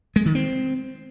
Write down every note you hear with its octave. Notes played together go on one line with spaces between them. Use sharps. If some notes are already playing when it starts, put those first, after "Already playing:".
G#3
D#3
C4